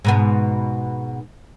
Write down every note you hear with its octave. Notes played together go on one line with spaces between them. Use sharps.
G#2 B2 B3